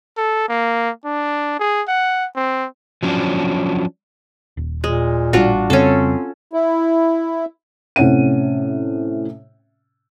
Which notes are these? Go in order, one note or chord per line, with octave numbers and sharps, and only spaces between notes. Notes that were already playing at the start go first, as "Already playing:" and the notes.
A4
A#3
D4
G#4
F#5
C4
F3 F#3 C#4 D4
D#1
A#2 G#3
A1 G3 D4 F4 F#4
F2 C#3 G3 C4 C#4 A4
E4
A2 C3 C#4 F#5 D#7